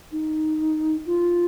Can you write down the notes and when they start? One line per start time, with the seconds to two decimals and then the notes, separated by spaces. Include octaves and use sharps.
0.12 D#4
1.06 F4